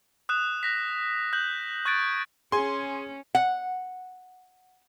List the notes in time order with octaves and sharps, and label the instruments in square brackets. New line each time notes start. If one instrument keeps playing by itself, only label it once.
[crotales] D#6 F#6 E7
F#6 A#6 B6
F#6 G6 F#7
C#6 F#6 G#6 A6 D7
[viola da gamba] C#4 [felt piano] G#4 [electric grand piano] G#5 C6
[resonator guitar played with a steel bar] F#5